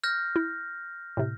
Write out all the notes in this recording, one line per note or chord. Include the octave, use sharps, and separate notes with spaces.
F6 G6 A#6
E4
A2 C3